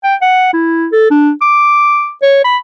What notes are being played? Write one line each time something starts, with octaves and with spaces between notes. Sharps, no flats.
G5
F#5
E4
A4
D4
D6
C#5
B5